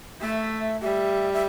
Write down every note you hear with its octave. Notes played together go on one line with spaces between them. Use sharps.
A3 E5
G3 E5
E5